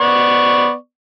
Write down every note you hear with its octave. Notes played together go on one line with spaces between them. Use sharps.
B3 D5 C#6